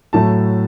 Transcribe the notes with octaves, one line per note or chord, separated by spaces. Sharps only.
A2 F#3 A3 A5